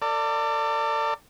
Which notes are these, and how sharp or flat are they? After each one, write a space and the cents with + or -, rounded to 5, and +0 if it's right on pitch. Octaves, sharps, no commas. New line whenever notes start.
A4 +40 D5 +0